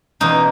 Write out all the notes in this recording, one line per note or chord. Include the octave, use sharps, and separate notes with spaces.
E2 B2 A#3 C#4 D#4